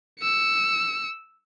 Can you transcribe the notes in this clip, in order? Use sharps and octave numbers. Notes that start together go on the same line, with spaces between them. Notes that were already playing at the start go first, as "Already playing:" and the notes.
E6 C#7